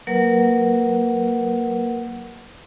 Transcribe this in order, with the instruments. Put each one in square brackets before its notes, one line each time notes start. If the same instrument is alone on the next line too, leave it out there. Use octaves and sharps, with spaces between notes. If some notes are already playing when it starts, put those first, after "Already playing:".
[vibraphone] F#3 A#3 A#4 B4 F#5